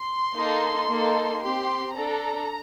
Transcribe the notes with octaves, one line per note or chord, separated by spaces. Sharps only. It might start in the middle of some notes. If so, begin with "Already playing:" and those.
Already playing: C6
A#3 D#4 A4
A#3 D#4 A4
C4 G4 C6
D4 A4 A#5